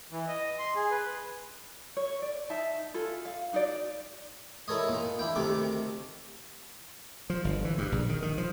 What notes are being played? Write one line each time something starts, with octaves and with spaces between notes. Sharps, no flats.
E3
D#5
C6
G#4
B4
C#5
D5
D#4 E5 A5
F4 G#4 A4
F5
D4 D#4 F#4 D5
E4 A4 A#4 C#5 D#5
A#2 D#4
D4 E4 G5
D2 C3 D#3 A4 A#4 D6
F3
G1
E3
G2
A#1
D#3
D#3
F3